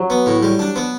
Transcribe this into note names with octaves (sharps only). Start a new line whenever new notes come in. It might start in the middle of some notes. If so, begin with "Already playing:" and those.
Already playing: F#3
B3
A2
G3
D4
B3